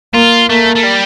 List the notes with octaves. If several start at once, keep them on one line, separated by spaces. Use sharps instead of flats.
A#3 F4
A3 A#3
A3
G3